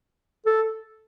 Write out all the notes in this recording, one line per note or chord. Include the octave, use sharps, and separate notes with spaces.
A4